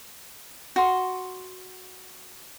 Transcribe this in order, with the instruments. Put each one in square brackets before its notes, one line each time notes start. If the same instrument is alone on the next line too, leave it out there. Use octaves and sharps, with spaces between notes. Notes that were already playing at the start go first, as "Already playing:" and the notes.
[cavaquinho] F#4 C6